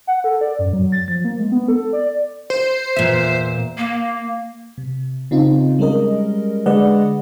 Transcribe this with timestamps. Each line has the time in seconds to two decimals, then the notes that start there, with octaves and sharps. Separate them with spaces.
0.07 F#5
0.24 A4
0.41 D5
0.59 F#2
0.73 F#3
0.92 A6
1.08 F3
1.25 A#3
1.39 G#3
1.52 B3
1.68 A4
1.93 D5
2.50 C5
2.97 E2 A#2 E5
3.77 A#3
4.78 C3
5.31 C#3 C4 D#4 F4
5.79 G3 G#3 C#4 A#4 D#5
6.66 D3 G#3 B4 D5 D#5 F#5